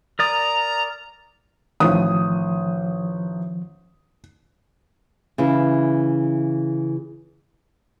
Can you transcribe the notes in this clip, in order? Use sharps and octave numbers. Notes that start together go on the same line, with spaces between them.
A#4 D5 A#5 D#6
A1 D#3 F3 D#6
C#3 E3 E4